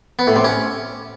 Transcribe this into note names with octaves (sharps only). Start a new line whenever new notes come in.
B3
A2
C3
C#4